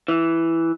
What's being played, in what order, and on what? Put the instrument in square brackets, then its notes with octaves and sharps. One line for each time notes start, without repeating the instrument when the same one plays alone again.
[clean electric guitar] E3